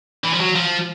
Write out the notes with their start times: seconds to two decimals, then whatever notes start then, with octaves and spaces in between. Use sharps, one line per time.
0.24 E3
0.33 F3
0.40 F#3
0.55 F3